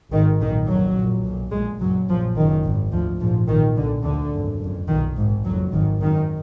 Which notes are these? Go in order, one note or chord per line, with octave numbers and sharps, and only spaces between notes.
G#1 G#2 D#3
B1 A#2 D#3
F#1 F2 F#3
A#1 A#2
B1 A#2
A#1 A#2 G#3
F#1 F#2 F#3
A#1 A#2 F3
F#1 F#2 D#3
G#1 G#2
D2 F3
A#1 G#2 F3
B1 A#2 D#3
B1 A#2 D3
D2 D3
G#1 F#2
F#1 F2
B1 A#2 D#3
G#1 G#2
F#1 F2 F#3
G#1 G#2 D#3
G#1 F#2 D#3